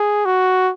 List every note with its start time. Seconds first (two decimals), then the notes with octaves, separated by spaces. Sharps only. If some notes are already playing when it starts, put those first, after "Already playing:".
Already playing: G#4
0.25 F#4